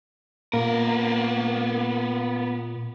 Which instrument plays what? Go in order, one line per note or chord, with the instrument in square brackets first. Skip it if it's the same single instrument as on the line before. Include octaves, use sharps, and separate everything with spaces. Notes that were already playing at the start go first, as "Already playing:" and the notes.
[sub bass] A#2 [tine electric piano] A#3 [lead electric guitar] B3 A#4